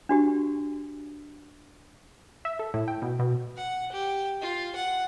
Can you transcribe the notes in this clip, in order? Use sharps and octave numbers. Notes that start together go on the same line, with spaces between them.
D4 F#4 G4
E5
A4
A2
G5
B2
B2
F#5
G4
F4
F#5